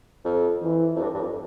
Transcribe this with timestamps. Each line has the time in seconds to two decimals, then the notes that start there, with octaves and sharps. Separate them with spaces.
0.25 F2
0.63 E3
0.96 F2
1.02 G2
1.14 G2
1.21 F2